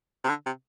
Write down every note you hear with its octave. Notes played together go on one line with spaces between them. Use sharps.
C3
D3
C3